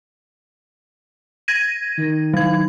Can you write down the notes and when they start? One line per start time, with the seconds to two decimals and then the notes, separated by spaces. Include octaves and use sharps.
1.48 G#6 A#6 D#7
1.97 D#3
2.34 F#3 G#6